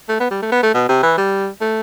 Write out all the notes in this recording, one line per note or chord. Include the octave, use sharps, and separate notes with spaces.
A3
B3
G3
A3
B3
A3
B2
C3
E3
G3
A3